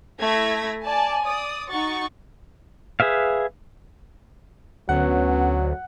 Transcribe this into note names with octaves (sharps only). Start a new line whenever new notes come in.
A3 E4 G#6 A#6 B6
D5 G#5 A5
D5 D#6
D#4 F#4 C#6 A6
G#4 B4 E5 F5
D2 F#3 B3 C#4 F#5